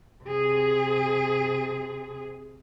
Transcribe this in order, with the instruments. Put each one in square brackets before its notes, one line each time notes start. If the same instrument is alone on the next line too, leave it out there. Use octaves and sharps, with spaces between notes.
[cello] C3 G#4